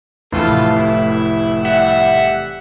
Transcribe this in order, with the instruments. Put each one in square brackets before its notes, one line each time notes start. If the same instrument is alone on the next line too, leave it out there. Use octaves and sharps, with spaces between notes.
[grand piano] F1 A2 E3 [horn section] F4 A4
[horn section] E4
G3 E5 F#5